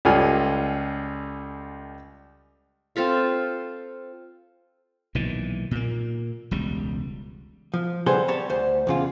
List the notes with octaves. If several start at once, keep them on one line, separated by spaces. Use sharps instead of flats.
C#2 G3 F4 A4 G#5
C4 F4 A4 F5
B1 A#2 D#3 E3
A#2 A#3
E1 C#2 G3
F3
D3 G3 G#4 A4 B4 C5
G3 C#5 A5
D2 C5
E2 C#3 F4